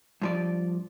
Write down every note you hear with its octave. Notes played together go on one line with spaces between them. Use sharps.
G2 F3 D5